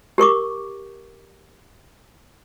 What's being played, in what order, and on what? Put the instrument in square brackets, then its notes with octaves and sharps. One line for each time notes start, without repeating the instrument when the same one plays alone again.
[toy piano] G4 A#4 C#6 D6